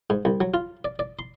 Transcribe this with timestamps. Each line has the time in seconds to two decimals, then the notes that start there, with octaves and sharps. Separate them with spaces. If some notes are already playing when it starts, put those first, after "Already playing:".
0.10 G#2
0.25 C2
0.41 F#3
0.54 F4
0.85 D5
0.99 D5
1.19 C6